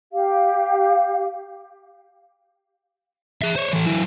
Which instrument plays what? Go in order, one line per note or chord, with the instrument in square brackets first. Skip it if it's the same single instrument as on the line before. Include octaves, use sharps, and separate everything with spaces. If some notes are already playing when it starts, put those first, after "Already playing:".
[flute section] G4 F5
[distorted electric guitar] G#4 E5
C5 C#5
E3 A4
F#3 E4